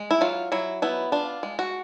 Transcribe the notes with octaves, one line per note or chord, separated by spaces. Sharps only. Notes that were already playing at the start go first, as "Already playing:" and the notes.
Already playing: G#3
E4
F#3 F4
F#3 E4
B3 E4
D4 F4
G#3
F#4